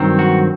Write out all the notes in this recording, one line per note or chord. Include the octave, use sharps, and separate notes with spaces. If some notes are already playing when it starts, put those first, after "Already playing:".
Already playing: G2 D#3 F#3 C4
F#4